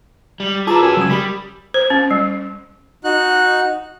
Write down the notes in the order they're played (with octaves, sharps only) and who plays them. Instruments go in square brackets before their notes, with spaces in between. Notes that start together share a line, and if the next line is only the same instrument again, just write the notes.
[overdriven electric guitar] G3
[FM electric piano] F4 A5 D6 [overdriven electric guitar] G#4 B4 [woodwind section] A#5 E6
[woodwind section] F#2 G#5 E6
[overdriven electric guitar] C#2 C#3 [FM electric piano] F#3 D#6
[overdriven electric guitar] G3 [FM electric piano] G4 B5 B6
[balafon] C5
C#4
G3
[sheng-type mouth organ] D#4 F#4 F#6